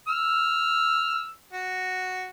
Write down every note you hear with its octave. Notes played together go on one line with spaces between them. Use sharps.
E6 F6
F#4